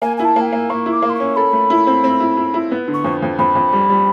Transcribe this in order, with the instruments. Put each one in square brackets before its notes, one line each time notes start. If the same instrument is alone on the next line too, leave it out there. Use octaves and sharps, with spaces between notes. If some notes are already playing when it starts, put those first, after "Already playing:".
[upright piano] A#3 [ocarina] G#5
[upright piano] E4 [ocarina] G#5
[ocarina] A5
[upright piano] A#3 [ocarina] G5
[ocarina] G#5
[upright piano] A#3
[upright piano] A#3 [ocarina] C#6
[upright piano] E4
[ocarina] D6
[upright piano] A#3
[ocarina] C6
C#6
[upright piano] C#4
[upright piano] A4 [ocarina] B5
[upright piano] A3
E4
C4
C4
E4
E4
E4
B3
D3
[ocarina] C#6
[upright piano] F2
F2
[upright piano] F2 [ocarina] B5
[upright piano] F2
G3
G3